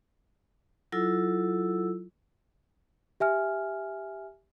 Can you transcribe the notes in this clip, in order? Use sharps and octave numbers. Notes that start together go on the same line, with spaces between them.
F#3 E4 F4 A4 E6
G4 E5 G#5 F6